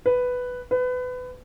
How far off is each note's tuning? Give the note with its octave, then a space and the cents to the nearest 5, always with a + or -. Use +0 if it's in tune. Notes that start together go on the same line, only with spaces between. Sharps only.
B4 +5
B4 +25